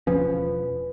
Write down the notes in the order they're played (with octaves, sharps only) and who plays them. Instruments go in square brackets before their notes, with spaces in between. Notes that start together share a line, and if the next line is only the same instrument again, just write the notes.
[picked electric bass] E1 F3 C#4 [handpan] B4